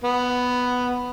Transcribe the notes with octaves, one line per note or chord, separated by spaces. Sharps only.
B3